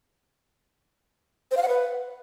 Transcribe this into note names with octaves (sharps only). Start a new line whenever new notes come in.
C5
F5
F#5
B4